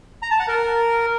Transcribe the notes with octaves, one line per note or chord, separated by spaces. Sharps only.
A#5
A5
F#5
A#4